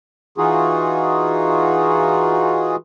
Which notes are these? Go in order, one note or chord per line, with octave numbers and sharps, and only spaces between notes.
E3 D#4 F4 F#4 G#4